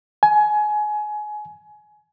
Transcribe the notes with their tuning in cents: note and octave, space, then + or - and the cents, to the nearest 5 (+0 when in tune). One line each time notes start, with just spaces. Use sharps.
G#5 +25